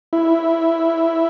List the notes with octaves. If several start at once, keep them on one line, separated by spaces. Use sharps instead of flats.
E4